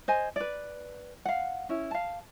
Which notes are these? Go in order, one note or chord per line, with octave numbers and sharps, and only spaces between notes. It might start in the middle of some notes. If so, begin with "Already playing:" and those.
C5 D#5 G#5
B4 D5
F5 F#5
C#4 E4
F5 A5